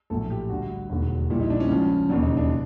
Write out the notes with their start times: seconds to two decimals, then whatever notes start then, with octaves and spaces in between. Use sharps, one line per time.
0.10 A#1 A2 F#3 A4
0.30 G4
0.50 D2 D3 G3 F#4
0.89 E1 D#2 D3
1.30 A#1 A#2 G3 E4
1.40 D#4
1.50 D4
1.60 C#4
1.70 C#2 C#3 F3
2.09 E1 D#2 C#3 F#3 D4
2.23 D#4
2.37 D4